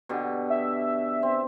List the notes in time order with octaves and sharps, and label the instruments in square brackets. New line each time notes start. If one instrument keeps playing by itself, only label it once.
[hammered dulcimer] B2 D3 G4
[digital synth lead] E5
[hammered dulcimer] C4